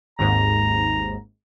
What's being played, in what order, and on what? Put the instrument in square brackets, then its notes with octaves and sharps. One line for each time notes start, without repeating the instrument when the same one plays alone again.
[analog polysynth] G#1 D#2 G#2 [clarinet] A#5